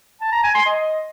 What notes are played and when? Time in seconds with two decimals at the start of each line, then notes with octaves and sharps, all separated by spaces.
0.21 A5
0.32 A#5
0.43 G#5
0.55 C6
0.66 D#5